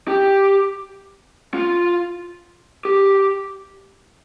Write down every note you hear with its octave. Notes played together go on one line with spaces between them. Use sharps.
G4
F4
G4